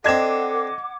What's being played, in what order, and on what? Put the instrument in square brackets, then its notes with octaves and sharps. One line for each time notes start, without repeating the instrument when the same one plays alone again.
[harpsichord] C4 D4 [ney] A4 [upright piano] D#5 G#6 E7 [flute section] F#5 D6